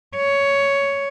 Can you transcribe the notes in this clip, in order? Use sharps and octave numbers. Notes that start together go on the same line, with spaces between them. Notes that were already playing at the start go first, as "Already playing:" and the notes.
C#5